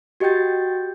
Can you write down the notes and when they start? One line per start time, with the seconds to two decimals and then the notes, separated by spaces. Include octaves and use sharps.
0.20 F#4 G4 D#5 G5 G6 A6